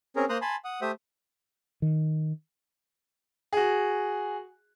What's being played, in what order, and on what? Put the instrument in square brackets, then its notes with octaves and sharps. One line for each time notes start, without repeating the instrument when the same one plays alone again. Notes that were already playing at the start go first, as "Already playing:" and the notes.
[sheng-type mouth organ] C4 C#4 G#4 A#4
A#3 C5 A#5 C6 D#6 F#6
G#5 A5 B5 C6
F#5 D#6
A3 G4 C5 E5 D#6
[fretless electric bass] D#3
[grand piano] F#4 G#4